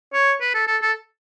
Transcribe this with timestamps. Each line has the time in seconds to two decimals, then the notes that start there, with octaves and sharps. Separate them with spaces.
0.14 C#5
0.41 B4
0.54 A4
0.67 A4
0.82 A4